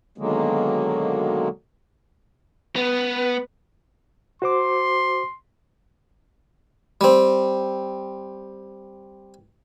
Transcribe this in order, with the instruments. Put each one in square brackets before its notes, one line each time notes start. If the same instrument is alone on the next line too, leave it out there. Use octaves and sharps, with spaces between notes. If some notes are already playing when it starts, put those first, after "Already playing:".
[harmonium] B2 D3 D#3 F#3 G#3 A#3
[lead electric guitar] B3 [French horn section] B4
[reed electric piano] F#4 C5 D6 [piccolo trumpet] C6
[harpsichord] G3 C4